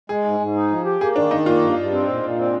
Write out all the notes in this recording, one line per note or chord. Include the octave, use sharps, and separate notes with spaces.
G#3 G#4
G#2
G#2
D#4
F3
G4
A#3 G#4
D#3 D4
D#3 D#4
A#3 F4
G2
G2
C4
A#2
A#2
C4